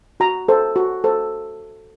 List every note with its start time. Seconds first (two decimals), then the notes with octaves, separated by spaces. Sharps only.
0.20 F#4 A#5
0.48 A4 C5
0.76 F#4
1.04 A4 C5